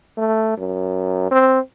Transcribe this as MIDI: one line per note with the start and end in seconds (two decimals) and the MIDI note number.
0.17 0.55 57
0.58 1.28 42
1.31 1.59 60